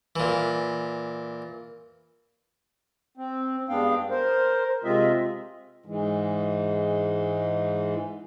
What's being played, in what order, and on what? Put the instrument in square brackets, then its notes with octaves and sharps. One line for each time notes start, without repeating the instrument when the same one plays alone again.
[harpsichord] A#2 E3
[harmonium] C4
G2 G#3 B3 D4 F5 G5
A#4 C5
C3 G#3 C4 F4 D#5 E5
G#2 E3 G#3